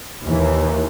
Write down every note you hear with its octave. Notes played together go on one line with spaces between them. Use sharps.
D#2 E3